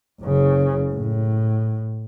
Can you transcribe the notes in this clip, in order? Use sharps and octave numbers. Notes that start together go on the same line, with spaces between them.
F#1 C#3
A2